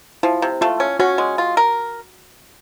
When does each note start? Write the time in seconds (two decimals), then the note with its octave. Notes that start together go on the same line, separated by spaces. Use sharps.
0.23 F3 E4
0.42 C3
0.61 A3 F4
0.80 C#4
0.99 C#4 F#4
1.18 G#3
1.38 F4
1.57 A#4